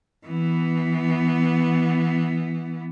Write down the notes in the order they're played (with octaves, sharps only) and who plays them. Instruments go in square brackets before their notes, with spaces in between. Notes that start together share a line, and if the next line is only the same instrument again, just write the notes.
[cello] E3 B3